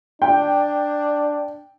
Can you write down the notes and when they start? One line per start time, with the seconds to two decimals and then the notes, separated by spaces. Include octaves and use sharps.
0.22 D4 G5